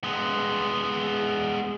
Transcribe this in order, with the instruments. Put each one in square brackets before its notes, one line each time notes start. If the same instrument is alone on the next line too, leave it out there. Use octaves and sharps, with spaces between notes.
[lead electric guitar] G#3 B3